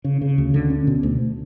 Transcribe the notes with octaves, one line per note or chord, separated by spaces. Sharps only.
C#3
C#3
D2
D3
C#4
B2
D2